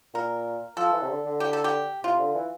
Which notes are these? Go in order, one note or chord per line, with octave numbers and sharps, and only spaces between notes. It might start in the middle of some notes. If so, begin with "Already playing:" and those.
A#2 A#4
F3 A4
E3
C3
D3
D3
G4
A4
G4
C3 F4
D3
E3